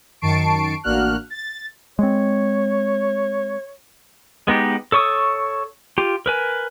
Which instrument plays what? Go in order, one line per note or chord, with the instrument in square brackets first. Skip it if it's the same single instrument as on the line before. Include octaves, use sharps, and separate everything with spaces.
[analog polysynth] F#2 D#3 A5 C#6 C7 D7
A1 A#3 D4 F#4 F6 F#6
A6
[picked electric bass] G#3 C4 [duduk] C#5
[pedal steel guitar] G#3 B3 D#4 G4
A4 C#5 C#6 D#6 E6
F4 G4
A#4 B4 G#5